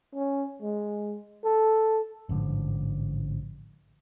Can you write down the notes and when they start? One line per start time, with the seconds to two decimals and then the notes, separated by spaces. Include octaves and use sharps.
0.15 C#4
0.62 G#3
1.44 A4
2.29 A1 G#2 D3 F3